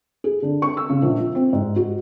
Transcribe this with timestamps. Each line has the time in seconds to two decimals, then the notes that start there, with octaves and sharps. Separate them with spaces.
0.24 G#4
0.42 D3
0.62 C#6
0.77 E6
0.90 C#3
1.02 A#1
1.18 F3
1.35 C4
1.53 G#2
1.76 F#4